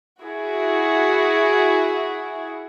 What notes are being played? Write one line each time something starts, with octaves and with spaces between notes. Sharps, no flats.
E4 F#4 G#4